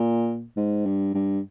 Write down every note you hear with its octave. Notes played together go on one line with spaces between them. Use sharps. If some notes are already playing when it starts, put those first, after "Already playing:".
Already playing: A#2
G#2
G2
G2